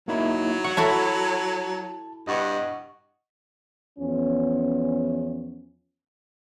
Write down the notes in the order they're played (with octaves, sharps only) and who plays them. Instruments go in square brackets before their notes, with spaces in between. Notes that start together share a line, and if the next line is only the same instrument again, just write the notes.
[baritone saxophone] F#3 [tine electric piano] A#3 D#4 E4
[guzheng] F#5 [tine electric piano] C#6
[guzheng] E4 F#4 A4 [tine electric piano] A5
[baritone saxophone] G2 [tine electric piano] D#5 F#5 C#6
[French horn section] E2 F3 B3 C#4